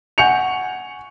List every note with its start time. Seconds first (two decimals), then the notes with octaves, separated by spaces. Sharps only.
0.18 F#5 G#5 C#6 G6 C#7 F7